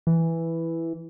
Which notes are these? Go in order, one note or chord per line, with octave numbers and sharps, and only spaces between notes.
E3